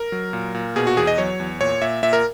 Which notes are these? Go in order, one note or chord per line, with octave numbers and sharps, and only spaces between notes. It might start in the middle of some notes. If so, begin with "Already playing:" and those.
Already playing: A#4
F#3
A#2
A#2
B2 G#4
F#4
E2 G#4
D#5
F#3 C#5
E2
A#2 C#5
A#2 E5
A#2 E5
A#4